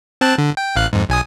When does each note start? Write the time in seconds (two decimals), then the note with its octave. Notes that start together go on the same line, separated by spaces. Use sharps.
0.21 C4 A5 F#6
0.38 D3
0.57 G5
0.76 A1 F5 F#6
0.93 F2 G#2
1.09 B1 G#5 D#6